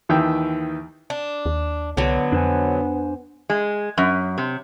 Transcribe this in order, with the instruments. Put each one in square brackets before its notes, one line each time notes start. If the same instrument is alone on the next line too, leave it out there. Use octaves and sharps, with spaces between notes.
[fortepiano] D#2 D#3 E3 E5 G5
[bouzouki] D4
[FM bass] D#2
[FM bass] C2 [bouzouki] D3 F#3 [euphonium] B3
[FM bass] F2 [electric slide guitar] D4 C5 G#5
[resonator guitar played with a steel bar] G#3
F#2
C3